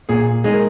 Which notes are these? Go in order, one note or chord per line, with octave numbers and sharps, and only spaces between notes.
A#2 G#4
G#3 D#4 G#4
A#4